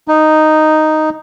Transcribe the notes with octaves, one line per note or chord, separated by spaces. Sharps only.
D#4